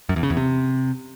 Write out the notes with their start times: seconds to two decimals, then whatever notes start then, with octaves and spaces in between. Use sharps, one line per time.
0.09 F#2
0.16 E2
0.23 C#3
0.30 E2
0.37 C3